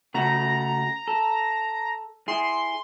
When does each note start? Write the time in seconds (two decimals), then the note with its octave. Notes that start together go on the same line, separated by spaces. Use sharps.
0.14 C#3 A3 F#4 A#5
1.08 A4
2.28 E4 G#4 C6